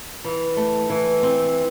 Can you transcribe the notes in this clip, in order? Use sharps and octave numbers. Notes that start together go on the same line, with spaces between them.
E3
A3
E3
C4